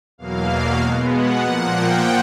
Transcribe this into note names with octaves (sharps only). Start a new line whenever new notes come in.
E2 B2 F#3 A#3 F5
B2 G#3 B3
F#5
A#2 F3 A#3 F#5
G5